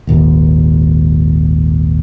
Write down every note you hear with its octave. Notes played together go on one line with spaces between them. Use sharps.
D#1 G#1 D#2